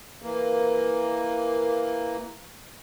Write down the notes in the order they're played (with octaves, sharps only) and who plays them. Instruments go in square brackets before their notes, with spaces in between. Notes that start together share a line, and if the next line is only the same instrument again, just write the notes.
[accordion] E3 A#3